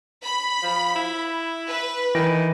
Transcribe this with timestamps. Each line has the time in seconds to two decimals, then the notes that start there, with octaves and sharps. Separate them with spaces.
0.24 B5
0.63 F3
0.96 E4
1.68 B4
2.15 D#3 E3 A#6 D7